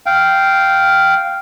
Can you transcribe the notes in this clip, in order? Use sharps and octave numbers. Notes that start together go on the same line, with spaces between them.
F5 G5